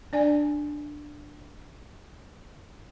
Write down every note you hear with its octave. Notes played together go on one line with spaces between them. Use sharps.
D4 D5 G#5